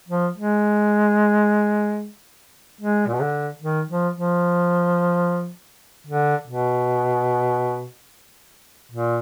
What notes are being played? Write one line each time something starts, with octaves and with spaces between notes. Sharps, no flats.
F3
G#3
G#3
A#2
B2
D3
D#3
F3
F3
D3
B2
A#2